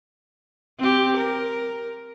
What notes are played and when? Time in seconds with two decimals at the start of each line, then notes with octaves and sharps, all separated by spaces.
0.79 C4 G4
1.17 A#4